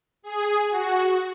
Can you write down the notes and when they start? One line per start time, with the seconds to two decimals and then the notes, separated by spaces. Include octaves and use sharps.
0.22 G#4
0.69 F#4